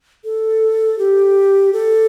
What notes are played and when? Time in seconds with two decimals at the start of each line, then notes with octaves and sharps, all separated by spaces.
0.25 A4
0.99 G4
1.73 A4